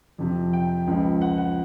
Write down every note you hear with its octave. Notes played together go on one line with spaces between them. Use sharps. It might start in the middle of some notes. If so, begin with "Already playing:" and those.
F2 C3 F3
G5
C#2 C#3 F3
F#5
F#5